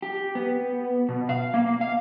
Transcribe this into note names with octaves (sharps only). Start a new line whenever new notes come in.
G4
B3
B2
F5
A#3
F5